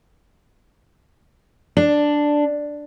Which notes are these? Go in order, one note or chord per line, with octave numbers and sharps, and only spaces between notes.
D4